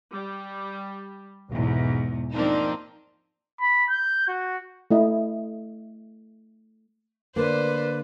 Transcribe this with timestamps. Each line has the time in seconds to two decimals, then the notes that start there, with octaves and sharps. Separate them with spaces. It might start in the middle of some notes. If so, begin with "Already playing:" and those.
0.12 G3
1.50 B1 E2 G#2
2.35 F3 A#3 C4 D4 D#4
3.61 B5
3.90 G6
4.28 F#4
4.91 A3 E4 D#5
7.36 D3 A#3 B4 C5 D5